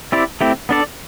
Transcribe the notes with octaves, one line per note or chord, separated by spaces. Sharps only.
C4 E4 G4 D5
A3 C4 E4 G4
B3 D4 A4 D5